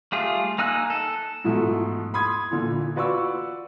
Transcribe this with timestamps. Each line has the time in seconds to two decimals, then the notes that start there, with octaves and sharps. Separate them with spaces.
0.12 G3 A3 F4 G#4
0.58 A#3 D#4 G#5 E6 F#6
0.90 A4
1.44 G#2 B2 E3 F3 A3
2.14 B5 C6 D#6 G#6
2.51 A#2 D3 E3
2.95 F4 F#4 B4 D5 C#6 E6